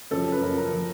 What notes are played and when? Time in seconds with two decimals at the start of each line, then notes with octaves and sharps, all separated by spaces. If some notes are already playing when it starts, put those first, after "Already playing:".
0.11 F#2 C#3 F3 A4
0.32 B4
0.42 F#2 C#3 F3 A#4
0.57 A#4
0.72 F3